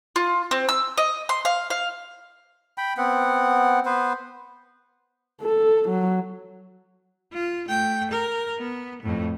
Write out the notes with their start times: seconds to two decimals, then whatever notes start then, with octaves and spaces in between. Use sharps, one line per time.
0.16 F4
0.51 C4
0.69 E6
0.98 D#5
1.29 C6
1.45 F5
1.70 F5
2.78 G5 B5
2.97 B3 C4 F#5
3.86 B3 B4 C5
5.41 A4
5.89 F#3
7.33 F4
7.69 A3 G5
8.11 A#4
8.58 B3
9.03 F2 A2